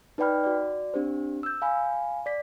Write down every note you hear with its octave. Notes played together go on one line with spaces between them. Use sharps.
D#4 B4 D5 G5 B5 F6
F#4 D5
C4 D4 G4 C5
E6 G6
F5 G#5 B5
D5 B6